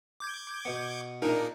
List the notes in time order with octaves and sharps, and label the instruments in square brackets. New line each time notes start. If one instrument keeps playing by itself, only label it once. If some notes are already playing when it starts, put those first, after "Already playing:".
[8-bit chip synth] D6 G6 G#6
[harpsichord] B2 B3
[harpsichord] A#2 G#4 [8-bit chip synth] D4 D#4 [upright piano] A#4